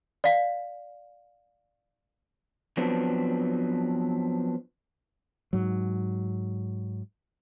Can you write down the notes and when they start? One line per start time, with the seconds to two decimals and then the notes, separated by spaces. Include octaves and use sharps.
0.24 D5 F5
2.77 F3 F#3 B3 C4 D4
5.53 G#2 F#3